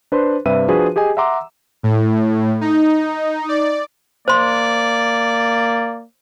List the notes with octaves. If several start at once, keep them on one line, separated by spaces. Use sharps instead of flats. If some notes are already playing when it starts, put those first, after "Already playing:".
D4 B4 C5 C6
G2 C3 G3 B4 E5 D#7
F3 D4 F#4 G#4 B4 C5
G4 G#4 D#5 G#5
E5 F#5 A#5 C6 D6 E6
A2
D#4
D5
A#3 C5 D5 C6